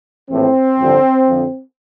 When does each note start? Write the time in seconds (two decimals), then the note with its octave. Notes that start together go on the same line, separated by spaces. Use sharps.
0.29 A#1 A2 E3 C4
0.78 A1 G2 D3 F3
1.27 F2 D3 F3